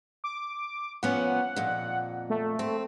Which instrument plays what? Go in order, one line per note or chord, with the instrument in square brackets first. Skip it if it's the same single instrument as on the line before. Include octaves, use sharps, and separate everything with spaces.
[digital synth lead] D6
[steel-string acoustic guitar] F3 B3 C#4 [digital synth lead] F#5
[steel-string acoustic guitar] F2 A#2
[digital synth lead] A3
[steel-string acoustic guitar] C4